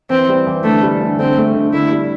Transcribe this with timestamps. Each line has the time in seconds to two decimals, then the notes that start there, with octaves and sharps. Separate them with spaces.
0.10 E3 C4
0.29 G3
0.47 E3
0.64 D3 A3
0.83 G3
1.01 D3
1.19 D3 C4
1.37 A3
1.54 D3
1.73 D3 E4
1.92 G3